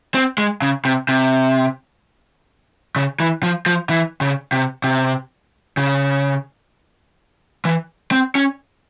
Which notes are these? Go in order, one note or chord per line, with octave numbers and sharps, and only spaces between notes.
C4
G#3
C#3
C3
C3
C#3
E3
F3
F3
E3
C#3
C3
C3
C#3
E3
C4
C#4